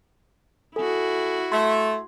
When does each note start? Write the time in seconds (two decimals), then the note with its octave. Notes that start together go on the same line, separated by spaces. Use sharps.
0.76 E4 F#4 A4 G#5
1.52 A3 C6 G#6